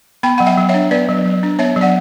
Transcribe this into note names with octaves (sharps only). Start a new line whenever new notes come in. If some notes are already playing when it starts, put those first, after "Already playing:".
B3 G5 B5
F#3 F#5
E5 G5
F#3
C#5 E5
D4
B3 B4 D5
F#3
F#3
D4
B3 C#5 E5
F#3
D5 F#5